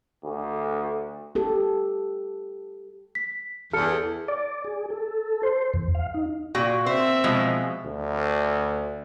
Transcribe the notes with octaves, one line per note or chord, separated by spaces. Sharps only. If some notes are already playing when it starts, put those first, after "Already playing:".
D2
G4 A4
B6
E2 A4 F6 C#7
D5
G#4
A4
C5
E2
F5
D#4
A#2 F#4 G5
C4 C5 E5
B2 F3 G#3
D2